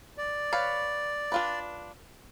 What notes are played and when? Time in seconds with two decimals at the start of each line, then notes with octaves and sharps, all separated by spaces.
0.18 D5
0.53 B4 C#5 F5
1.32 D4 F4 B4